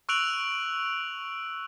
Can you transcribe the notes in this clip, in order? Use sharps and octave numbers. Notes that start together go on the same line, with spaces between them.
C#6 E6 F#6 D7 F7 F#7